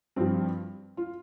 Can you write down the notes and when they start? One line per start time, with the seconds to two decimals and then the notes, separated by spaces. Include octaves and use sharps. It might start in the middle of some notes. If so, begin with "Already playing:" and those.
0.16 G2 F3 C4
0.97 F4